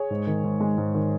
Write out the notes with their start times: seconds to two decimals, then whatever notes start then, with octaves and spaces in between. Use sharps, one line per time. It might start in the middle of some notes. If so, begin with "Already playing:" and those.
Already playing: G#4 C#5
0.11 G#2
0.27 D#3
0.44 G#2
0.61 G#3
0.78 G#2
0.95 D#3